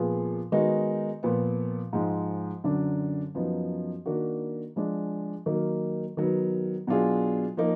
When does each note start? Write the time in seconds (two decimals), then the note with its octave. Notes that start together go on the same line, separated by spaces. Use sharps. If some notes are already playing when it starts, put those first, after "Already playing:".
Already playing: A#2 F3 B3 F4 G#4
0.52 D#3 G#3 B3 D#4 F#4
1.23 A#2 F3 B3
1.93 G#2 F3 G#3
2.64 F#2 D3 F#3 D4
3.35 F#2 F3 B3 D#4
4.06 D#3 A#3 D4 F#4
4.76 F3 G#3 D4 G#4
5.46 D#3 F#3 A#3 D#4
6.17 D#3 F#3 B3
6.87 B2 F#3 D4 F4 G#4
7.57 F3 A#3 D#4